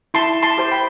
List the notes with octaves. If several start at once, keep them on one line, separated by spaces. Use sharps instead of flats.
E4 A5 C6
A5 C6
G4 C5
G5 B5